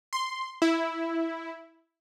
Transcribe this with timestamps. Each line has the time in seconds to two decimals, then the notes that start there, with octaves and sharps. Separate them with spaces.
0.13 C6
0.62 E4